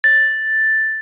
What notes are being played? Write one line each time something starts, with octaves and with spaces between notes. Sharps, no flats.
A6